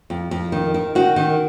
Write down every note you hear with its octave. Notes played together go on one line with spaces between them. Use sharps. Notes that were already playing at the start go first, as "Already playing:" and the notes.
F2
F2
D#3
D#3
D#3 F#4
D#3